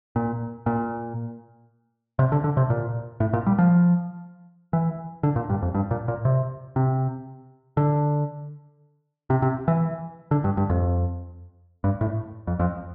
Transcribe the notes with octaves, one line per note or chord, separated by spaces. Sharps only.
A#2
A#2
C3
D3
D3
C3
A#2
A2
A#2
G3
F3
E3
D3
A#2
G2
F2
G2
A#2
A#2
C3
C3
D3
C3
C3
E3
D3
G2
G2
F2
G2
A2
F2
F2